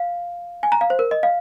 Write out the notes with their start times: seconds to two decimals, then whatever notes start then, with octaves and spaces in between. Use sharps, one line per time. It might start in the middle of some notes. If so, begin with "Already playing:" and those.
Already playing: F5
0.63 G#5
0.72 A#5
0.81 F5
0.90 C5
0.99 A#4
1.11 D#5
1.23 F5